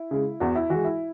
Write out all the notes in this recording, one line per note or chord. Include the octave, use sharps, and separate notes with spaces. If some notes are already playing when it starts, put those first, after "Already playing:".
Already playing: E4
C#3 G#3
E2 F#4
E4
E3 G#3 F#4
E4